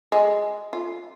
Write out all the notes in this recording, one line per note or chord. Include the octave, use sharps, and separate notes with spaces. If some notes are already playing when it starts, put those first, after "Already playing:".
G#3
F4